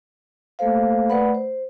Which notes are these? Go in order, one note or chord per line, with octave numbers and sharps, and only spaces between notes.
A3 A#3 A4 C5 F5
A3 B4 D5 F#5 B5
C5